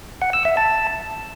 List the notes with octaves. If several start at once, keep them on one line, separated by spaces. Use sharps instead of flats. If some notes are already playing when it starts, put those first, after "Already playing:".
F#5
E6
E5
A5